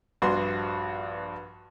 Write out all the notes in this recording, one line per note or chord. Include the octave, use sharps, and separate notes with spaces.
A#1 G2 F#4 B4 C6